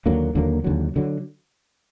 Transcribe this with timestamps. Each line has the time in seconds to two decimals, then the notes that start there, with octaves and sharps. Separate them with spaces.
0.06 D#2 D3 F#3 A#3
0.35 D#2 D3 F#3 A#3
0.64 D#2 D3 F#3
0.96 D3 F#3